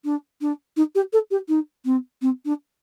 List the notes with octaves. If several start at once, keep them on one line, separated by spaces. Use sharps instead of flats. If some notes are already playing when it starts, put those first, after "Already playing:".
D4
D4
D#4
G4
A4
G4
D#4
C4
C4
D4